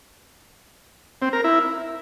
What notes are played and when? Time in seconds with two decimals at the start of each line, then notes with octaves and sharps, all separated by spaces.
1.22 C4
1.33 A#4
1.44 E4